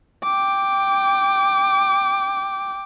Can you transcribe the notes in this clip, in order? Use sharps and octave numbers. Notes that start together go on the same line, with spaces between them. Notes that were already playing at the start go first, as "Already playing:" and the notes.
G5 D6